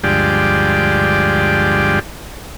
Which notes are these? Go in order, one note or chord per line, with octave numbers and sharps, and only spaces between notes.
D2 G2 F3 G#3 G4 D5